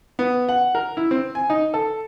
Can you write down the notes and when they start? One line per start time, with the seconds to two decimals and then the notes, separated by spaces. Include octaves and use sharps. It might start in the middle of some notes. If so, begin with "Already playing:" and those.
0.19 B3
0.49 F#5
0.75 A#4
0.97 E4
1.11 C4
1.35 G#5
1.50 D#4
1.74 A4